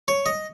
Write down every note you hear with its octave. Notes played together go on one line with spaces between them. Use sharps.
C#5
D#5